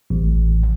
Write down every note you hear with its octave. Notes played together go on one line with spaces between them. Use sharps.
A1